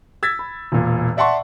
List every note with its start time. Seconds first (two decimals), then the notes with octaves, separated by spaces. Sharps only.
0.23 E6 G#6 A6 B6
0.39 B5
0.72 E1 A#2
1.17 D5 E5 F#5 A5 C6 C#6